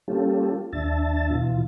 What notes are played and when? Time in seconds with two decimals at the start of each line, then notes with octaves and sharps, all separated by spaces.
0.08 G3 A#3 C#4 F4 G4 A4
0.73 D#2 D4 E5 A5 A6
1.30 B2 E3 F4